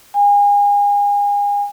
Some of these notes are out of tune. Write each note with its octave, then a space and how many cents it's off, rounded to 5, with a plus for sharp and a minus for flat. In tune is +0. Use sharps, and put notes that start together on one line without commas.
G#5 -35